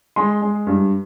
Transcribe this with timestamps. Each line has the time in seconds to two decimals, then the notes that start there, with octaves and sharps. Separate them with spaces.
0.16 G#3 C6
0.42 G#3
0.67 G2